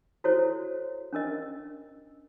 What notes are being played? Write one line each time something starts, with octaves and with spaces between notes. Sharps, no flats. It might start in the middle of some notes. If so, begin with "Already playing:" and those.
E4 F#4 A4 C5 C#5
C#4 D4 A#4 D#5